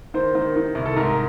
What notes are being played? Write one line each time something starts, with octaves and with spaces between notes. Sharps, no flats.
D#3 C5
D#3
D#3
C2
A4
G#2 A#4